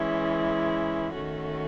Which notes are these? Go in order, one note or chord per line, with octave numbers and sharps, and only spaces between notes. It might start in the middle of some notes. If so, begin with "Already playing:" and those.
Already playing: E3 G#3 C#4 E4
D#3 A3 C#4 F#4